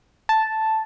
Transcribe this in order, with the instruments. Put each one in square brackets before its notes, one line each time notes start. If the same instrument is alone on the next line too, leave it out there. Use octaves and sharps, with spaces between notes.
[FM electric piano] A5